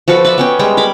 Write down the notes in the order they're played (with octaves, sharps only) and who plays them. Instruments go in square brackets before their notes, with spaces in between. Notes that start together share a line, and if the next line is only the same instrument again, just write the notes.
[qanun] F3 F#4 A4 B4
B4 D5 E5
B3 C#4 G5
G3 G#3 G5
A#4 B5 D6